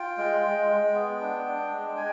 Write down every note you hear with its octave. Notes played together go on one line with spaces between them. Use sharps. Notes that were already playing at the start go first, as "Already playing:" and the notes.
Already playing: F4 G5
G#3
G#3
G#3
B3
D4
D4
G#3
G#3 G#5